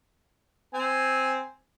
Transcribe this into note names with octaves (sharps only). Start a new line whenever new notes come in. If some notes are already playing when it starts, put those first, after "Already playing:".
C4 G#5